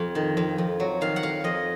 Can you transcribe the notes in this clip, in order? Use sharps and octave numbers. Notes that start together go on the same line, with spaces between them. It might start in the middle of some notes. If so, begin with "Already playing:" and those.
Already playing: F2
D#3
F2
F2
F#3
D#3 F5
F#5
F2 F5
F2 D#5